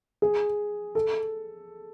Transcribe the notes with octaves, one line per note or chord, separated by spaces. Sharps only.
G#4
A4